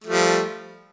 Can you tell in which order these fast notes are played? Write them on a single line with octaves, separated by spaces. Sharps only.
A3 F3 G3